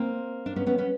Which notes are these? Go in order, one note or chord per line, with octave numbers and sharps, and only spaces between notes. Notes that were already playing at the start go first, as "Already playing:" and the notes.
Already playing: A#3 C4
D4
B3 C#4
B3 C#4
B3 C#4